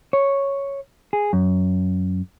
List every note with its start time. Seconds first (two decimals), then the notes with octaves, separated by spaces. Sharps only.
0.13 C#5
1.13 G#4
1.33 F#2